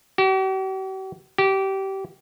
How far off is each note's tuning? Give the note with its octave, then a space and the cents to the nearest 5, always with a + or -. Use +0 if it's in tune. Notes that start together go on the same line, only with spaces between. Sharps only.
G4 -45
G4 -20